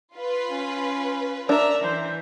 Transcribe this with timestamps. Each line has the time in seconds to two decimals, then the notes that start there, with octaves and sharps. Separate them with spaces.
0.15 F4 B4
0.49 C#4
1.49 D4 A#4 E5 A#5
1.83 E3 C5